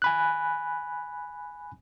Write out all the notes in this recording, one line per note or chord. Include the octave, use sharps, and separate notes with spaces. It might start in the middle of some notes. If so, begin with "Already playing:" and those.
G#5 B5 F#6